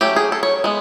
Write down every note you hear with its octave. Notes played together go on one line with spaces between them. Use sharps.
F#3 A3 C#4 G4
G#4
A4
C#5
G#3 B3